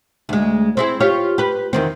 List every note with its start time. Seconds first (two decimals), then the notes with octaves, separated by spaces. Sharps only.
0.29 D2 G#3
0.77 C4 E4 G#4
1.00 F4 G4 C#5
1.38 G4 B4
1.73 E2 D#3 C4